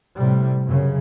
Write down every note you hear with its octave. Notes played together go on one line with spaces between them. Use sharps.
A2 C3 G3
F#2 C#3